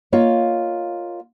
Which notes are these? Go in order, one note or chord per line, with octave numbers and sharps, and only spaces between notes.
A#3 F4 C#5 D#5 F5